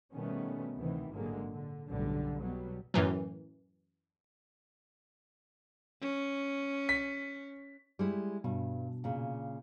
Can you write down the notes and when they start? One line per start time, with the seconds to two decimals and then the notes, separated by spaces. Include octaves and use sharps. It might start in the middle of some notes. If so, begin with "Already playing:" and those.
0.13 B2 D#3 G3 A3 B3 C#4
0.75 D2 C3 D#3 E3 B3
1.12 G#1 A#2 D3 F#3 G#3 A#3
1.51 D3
1.89 B1 F#2 A2 D3 G3
2.40 B2 F#3 G3 B3
2.94 F#2 A2 E3 F#3
6.01 C#4
6.89 B6
7.99 G3 G#3 E4
8.44 G2 B2
9.04 A#2 C#3